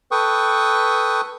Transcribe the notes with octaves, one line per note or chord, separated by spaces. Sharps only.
A4 B4 G5 C#6 D#6